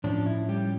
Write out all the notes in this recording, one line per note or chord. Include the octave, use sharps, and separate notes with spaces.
A2 F3 C#4 D4
E4
G3 G4